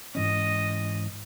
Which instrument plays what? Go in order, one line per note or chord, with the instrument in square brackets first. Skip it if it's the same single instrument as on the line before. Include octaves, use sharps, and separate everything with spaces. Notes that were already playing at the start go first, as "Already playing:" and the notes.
[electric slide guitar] G#2 E3 C#4 [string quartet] D#5